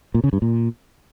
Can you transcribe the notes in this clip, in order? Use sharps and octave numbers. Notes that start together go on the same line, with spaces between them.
A#2
C#3
G2
A#2